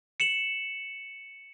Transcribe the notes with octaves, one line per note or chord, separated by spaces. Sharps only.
C#7 E7 F#7